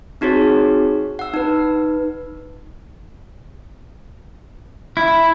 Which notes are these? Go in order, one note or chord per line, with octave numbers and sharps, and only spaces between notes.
C4 D#4 F#4 G#4 C#5
F#5 E6
D#4 B4
E4